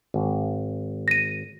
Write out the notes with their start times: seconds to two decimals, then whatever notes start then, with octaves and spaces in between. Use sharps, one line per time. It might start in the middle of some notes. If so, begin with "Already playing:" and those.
0.14 G#1
1.08 A#6 D#7